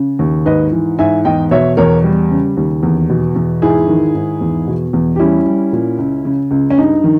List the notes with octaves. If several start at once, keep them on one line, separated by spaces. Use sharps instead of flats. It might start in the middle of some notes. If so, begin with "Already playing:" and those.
Already playing: C#3
D#2
G#2 B4 D#5
E3
G#2 E5 G#5
E2 D#5 G5
B2 C#5 E5
E2 A#4 C#5
G3
C#3
D#2
E2
B2
E2
G#2 E4 G#4
D#3
G#2
E2
B2
E2
G4
G3 C#4 E4
G3
A#2
C#2
C#3
C#2
C#4
G2 D#4
D#3